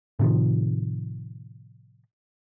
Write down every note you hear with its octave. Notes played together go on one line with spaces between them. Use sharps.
A2 C3 D#3 F3